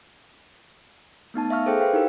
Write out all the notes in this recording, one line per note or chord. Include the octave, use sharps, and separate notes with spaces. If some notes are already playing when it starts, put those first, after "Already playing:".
A3 B3 D#4 A5
E5 F5 C#6 F6
G#4 A4 C5 G5
B4 C5 F5 G5
D#4 E4 G4 A#4